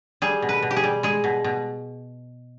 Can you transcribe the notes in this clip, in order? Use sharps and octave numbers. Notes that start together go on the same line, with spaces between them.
G3 G#4
B2
B4
B2
G4
G#4
G3
G#3 G#4
B2
B2